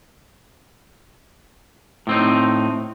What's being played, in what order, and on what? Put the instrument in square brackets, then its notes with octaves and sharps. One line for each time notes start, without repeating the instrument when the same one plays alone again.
[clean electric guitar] A2 C4 D#4